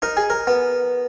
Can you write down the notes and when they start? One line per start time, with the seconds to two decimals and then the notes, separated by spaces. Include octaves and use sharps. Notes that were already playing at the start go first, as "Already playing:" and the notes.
0.02 D#4 A#4
0.17 G#4
0.30 A#4
0.47 B3